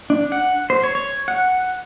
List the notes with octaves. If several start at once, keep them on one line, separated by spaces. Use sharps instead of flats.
D4
F#5
C5
C#5
C#5
F#5